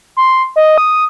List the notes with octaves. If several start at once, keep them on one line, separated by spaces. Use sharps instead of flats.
C6
D#5
D#6